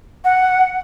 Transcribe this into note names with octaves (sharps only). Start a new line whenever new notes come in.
F#5